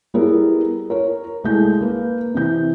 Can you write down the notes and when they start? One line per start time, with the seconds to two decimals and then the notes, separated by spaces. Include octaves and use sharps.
0.14 G3 B3 E4 G#4 A#4
0.90 A#4 C#5
1.44 C2 G#3 A3 G6
1.81 A#3 B4
2.34 C3 E3 G6